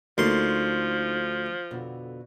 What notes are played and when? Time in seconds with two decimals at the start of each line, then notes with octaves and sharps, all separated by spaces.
0.18 D2 F3 A#3 D#4 A4 C6
1.71 F2 B2 D3